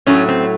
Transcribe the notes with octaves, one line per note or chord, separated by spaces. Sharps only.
A2 F#3 A3 C#4
C4